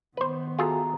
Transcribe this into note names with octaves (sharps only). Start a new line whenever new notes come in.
D#3 B3 B4 C5
F4 F#4 G#4 A4 E5 A#5